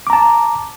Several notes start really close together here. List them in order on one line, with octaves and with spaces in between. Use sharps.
D6 A#5 A5